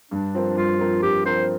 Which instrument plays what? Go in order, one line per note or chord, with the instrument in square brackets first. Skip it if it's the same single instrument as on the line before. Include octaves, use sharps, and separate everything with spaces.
[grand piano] G2 [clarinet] D4
[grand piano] F3 C4 A#4
[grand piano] G2 [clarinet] F4
[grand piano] F3 C4 A#4
[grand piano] G2 [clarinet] G4
[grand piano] F3 C4 A#4 [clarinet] C5